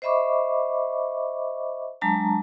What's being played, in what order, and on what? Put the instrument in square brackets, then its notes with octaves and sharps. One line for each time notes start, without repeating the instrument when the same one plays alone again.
[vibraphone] C5 D#5 E5 B5 C#6 D6
F#3 G#3 D4 A5 A#5